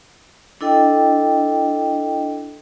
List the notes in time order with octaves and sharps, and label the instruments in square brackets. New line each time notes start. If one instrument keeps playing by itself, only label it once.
[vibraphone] D4 E4 A4 D#5 G5